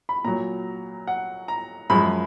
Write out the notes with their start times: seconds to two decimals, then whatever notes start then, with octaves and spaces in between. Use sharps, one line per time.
0.09 B5
0.24 A#2 F#3 A#5
1.07 F#5
1.48 A#5
1.90 F#2 F3 G#3 B5